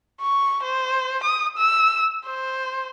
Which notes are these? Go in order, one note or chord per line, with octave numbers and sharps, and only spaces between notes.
C#6
C5
D#6
E6
C5